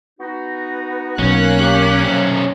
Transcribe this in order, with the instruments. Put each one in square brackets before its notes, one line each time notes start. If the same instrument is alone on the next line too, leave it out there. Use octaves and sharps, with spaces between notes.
[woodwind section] B3 D#4 F#4
[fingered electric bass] B1 [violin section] A#3 F#6 [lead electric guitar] C#4
[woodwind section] G4
[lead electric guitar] B1 C#4 [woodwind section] C3 F#3